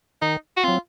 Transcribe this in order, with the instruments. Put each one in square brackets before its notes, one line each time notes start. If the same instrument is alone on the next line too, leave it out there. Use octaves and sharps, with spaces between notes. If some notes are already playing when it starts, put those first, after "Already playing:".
[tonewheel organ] D#3 [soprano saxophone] D#4
[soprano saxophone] F#4
[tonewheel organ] F#3 C4 [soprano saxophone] F4